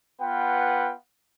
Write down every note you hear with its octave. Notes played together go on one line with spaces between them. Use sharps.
B3 F4 B4 F#5 G5